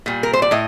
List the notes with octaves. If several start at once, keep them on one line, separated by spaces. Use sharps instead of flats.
A#2 G3
A#4
C5
D5
A2 D#5